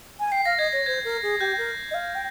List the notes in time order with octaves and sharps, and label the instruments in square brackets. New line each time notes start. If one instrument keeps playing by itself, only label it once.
[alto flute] G#5
[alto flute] G5 [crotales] C7
[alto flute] F5 [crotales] A#6
[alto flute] D#5 [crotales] G#6
[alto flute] C#5 [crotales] A#6
[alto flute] C5 [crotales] G#6
[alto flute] A#4
G#4
[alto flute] G4 [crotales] G6
[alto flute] A#4
D#5
F5
G5